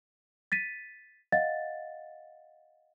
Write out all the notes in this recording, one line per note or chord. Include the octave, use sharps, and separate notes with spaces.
A6 B6 D#7
D#5 F5 F#5 A6